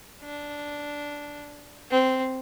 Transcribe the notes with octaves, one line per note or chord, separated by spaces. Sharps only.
D4
C4